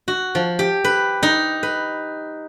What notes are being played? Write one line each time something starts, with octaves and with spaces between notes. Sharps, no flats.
F#4
F3
G4
B4
D#4
B4